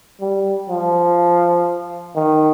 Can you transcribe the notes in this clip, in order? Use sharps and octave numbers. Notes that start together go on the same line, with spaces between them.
G3
F3
D#3